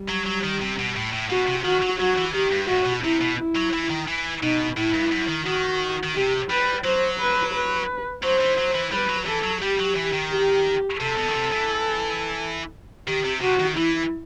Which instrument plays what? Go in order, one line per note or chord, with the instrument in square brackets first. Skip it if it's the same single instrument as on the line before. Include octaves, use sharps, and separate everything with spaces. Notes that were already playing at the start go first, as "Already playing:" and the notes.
Already playing: [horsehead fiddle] G3
[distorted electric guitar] F#3
F#3
D#3
C3
B2
A2
A2
[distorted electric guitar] B2 [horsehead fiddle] F#4
[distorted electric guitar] C3
[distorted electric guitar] D#3 [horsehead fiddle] F#4
[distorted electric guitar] F#3
[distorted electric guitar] F#3 [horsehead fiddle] F#4
[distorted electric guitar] E3
[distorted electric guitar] D#3 [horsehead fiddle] G4
[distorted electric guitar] G2
[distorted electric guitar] A2 [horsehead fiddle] F#4
[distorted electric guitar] B2
[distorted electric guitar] C3 [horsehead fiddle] E4
[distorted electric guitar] B2
[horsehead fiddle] E4
[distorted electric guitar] F#3
E3
D#3
E3
[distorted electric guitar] B2 [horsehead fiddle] D#4
[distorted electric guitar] A2 [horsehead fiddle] E4
[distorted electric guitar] G2
F#2
D#3
[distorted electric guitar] D#3 [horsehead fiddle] F#4
[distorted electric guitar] D#3
[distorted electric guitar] C3 [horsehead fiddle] G4
[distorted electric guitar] G3 [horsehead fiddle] B4
[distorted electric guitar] F#3 [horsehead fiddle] C5
[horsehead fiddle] B4
B4
[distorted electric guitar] F#3 [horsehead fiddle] C5
[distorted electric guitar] E3
F#3
E3
[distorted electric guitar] G3 [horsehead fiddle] B4
[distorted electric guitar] F#3
[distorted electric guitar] E3 [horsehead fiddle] A4
[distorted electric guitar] F#3
[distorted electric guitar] G3 [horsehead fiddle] G4
[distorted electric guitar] F#3
E3
D#3
[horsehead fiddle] G4
[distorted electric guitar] C3 [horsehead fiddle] A4
[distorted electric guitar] B2
D#3
C3
E3
[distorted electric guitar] D#3 [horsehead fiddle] G4
[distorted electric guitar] C3
[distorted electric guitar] C3 [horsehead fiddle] F#4
[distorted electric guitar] D#3
[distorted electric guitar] E3 [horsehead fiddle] E4